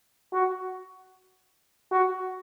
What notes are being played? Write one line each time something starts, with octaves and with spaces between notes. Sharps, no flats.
F#4
F#4